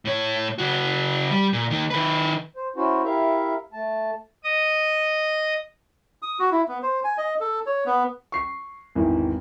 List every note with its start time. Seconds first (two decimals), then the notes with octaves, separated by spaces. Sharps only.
0.05 A2 C#5
0.58 C#3 F#4
1.31 G3
1.53 A#2
1.70 D#3 A#3
1.90 D#3 B4
2.56 C5
2.76 C#4 E4 F#4 C5
3.04 E4 G4 A#4 E5 F5
3.73 A3 A5
4.44 D#5 D#6
6.22 D#6
6.39 F#4
6.51 E4
6.68 B3
6.83 C5
7.04 G#5
7.18 D#5
7.40 A4
7.66 C#5
7.86 B3
8.32 C#6 C7
8.95 G#1 E2 D#3 E3